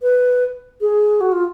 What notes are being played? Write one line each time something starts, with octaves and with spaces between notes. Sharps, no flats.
B4
G#4
F#4
F4